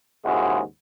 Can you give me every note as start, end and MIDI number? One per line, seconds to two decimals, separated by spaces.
0.25 0.61 39
0.25 0.61 44
0.25 0.61 49
0.25 0.61 56
0.25 0.61 64
0.25 0.61 66